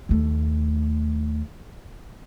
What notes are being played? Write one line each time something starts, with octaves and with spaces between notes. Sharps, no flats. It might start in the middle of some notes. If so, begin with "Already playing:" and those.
D#2 A3